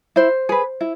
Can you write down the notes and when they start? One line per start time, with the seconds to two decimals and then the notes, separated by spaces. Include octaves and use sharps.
0.16 E4 C5
0.49 G#4 B4
0.81 E4